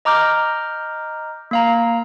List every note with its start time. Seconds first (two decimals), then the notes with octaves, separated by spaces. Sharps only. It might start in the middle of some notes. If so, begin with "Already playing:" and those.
0.05 D#5 A#5 D6 F6 G6
1.51 A#3 F5 A#5